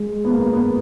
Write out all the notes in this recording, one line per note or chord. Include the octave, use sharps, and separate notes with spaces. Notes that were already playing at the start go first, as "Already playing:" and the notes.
Already playing: G#3
B3
A#3
B3